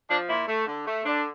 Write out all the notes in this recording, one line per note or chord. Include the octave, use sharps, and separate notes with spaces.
F3 D4
A#2 E4
A3
D3
A3
D3 D4